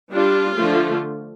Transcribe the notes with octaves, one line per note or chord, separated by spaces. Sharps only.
G3 D4 F4
D3 F3 A3